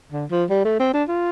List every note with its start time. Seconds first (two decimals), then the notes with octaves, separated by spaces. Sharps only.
0.12 D3
0.31 F3
0.50 G3
0.65 A3
0.79 C4
0.93 D4
1.08 F4